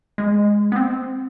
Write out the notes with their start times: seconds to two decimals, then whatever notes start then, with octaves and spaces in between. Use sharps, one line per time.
0.18 G#3
0.72 B3
0.76 C4